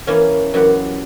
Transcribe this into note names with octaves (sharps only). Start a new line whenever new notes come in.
E3 A#3 C#4
F#2 E3 G4 F#5